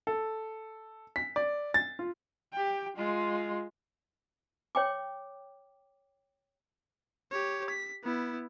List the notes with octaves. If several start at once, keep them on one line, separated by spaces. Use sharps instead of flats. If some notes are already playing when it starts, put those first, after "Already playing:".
A4
B6
D5
A6
F4
G4 G5
G#3 F4
C#5 G5 D6
G4 C#5
B6
B3 E4